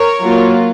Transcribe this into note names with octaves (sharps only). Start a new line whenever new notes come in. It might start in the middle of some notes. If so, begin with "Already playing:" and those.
Already playing: A#4 C#5
F#3 A#3 F4